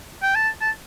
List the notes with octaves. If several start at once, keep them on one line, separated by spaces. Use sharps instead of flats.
G5
A5
A5